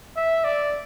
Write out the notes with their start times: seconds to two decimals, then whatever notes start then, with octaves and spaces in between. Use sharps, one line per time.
0.16 E5
0.44 D5